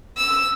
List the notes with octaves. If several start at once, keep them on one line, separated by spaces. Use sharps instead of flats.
E6